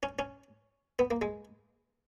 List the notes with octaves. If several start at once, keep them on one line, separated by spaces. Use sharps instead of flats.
C#4
C#4
B3
A#3
G#3